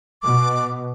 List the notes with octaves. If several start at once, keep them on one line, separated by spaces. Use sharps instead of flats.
B2 D6